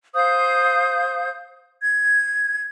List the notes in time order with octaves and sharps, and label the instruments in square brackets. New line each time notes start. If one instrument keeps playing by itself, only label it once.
[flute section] C5 F5 D#6 G6
G#6